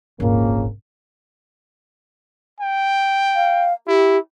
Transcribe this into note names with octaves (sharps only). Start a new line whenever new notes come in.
D#1 G#1 C#3 F3 A#3
G5
F5
E4 G4